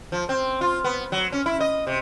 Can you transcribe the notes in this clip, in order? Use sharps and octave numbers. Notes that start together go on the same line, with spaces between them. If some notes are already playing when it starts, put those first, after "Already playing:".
F3
C4
F4
B3
F#3
C#4
E4
D#5
C3